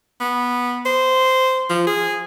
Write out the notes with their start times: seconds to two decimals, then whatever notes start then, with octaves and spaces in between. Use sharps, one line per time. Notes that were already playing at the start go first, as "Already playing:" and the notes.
0.21 B3
0.86 C5
1.70 F3
1.87 G#4